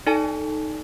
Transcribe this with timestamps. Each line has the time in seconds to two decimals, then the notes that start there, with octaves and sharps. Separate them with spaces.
0.07 D#4 A4 D5 G#5 A5